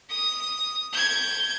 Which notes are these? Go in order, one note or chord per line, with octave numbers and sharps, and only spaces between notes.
D#6
G6 G#6